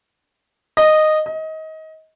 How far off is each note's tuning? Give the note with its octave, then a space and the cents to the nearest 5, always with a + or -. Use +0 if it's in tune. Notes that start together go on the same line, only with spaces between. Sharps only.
D#5 -10
D#5 +25